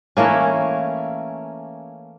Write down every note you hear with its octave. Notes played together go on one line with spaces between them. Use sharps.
E3 A3 A#3 C#4